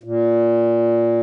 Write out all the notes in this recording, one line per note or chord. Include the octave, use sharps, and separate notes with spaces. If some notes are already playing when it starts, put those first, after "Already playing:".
A#2